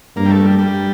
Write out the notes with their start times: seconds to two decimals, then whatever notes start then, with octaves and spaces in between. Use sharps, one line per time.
0.16 G2 A#3
0.25 G3
0.31 A3
0.46 G3
0.59 G3